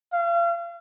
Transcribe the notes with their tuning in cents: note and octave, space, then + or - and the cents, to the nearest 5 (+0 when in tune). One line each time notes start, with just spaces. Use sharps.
F5 -35